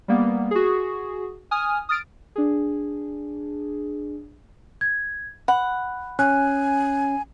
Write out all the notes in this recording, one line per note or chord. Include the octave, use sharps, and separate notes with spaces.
G3 A#3 B3
F#4 G#4
G#5 D#6 F6
D#6 F6 A6 D7
D4 G#4
G#6
F#5 B5
C#4 G#5 F#6